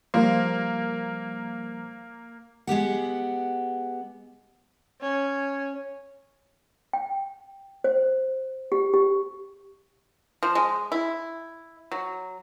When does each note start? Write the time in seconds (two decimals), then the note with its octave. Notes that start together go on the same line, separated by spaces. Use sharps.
0.14 F3 G3 A#3 C5
2.67 G#3 B3 G4 F#5
5.01 C#4
6.93 G5
7.84 C5
8.72 G4
8.93 G4
10.43 F3
10.55 G#3
10.92 E4
11.92 F#3